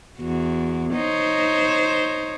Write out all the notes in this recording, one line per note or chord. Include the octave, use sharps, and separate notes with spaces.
E2 F#4
D#4 C5 C#5